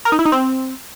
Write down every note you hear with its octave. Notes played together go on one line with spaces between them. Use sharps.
A#4
D#4
E4
D#4
C4